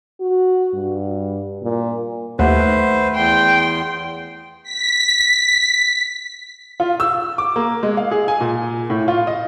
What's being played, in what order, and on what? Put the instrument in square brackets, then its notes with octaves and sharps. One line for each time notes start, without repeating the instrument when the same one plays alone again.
[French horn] F#4
G2
A#2
[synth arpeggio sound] D#2 [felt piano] A3 F#5 [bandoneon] B4 C5
[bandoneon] E2 C6 [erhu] G5
[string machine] B6
[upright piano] F4
E6
D6
A#3
G#3
F5
G#4
G#5
A#2
A2
F4
D#5